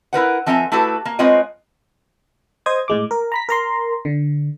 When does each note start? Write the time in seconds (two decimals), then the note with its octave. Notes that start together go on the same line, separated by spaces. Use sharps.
0.13 E4 A#4 B4 F#5
0.46 F3 C4 A4 E5 G#5 A#5
0.72 A3 E4 F#4 G4 A4 B4
1.05 A#3
1.19 G#3 C4 F4 B4 C#5 D#5
2.66 C5 D#5 D#6 G#6
2.88 A2 G#3 D6
3.11 A#4
3.32 A#5 B5 B6
3.49 A#4 A#5 C6
4.05 D3